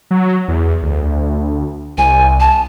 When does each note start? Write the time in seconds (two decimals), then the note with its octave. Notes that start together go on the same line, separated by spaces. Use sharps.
0.11 F#3
0.48 E2
0.83 D2
1.98 C2 G#5
2.40 A5